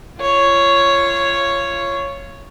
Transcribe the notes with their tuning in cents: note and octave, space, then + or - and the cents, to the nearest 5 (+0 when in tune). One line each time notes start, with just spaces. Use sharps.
F4 -25 C#5 +0